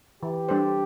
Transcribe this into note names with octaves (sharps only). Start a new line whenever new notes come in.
E3 G4
G3 D4 A4 C5